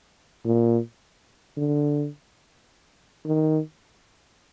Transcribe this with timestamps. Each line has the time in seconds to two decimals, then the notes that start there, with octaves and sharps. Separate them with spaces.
0.45 A#2
1.57 D3
3.26 D#3